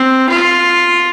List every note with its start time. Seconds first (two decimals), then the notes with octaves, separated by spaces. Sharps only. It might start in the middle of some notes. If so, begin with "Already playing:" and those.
Already playing: C4
0.29 F4